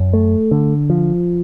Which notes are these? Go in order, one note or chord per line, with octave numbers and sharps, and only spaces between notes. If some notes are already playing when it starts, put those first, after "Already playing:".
Already playing: F#2
A3
D3
F3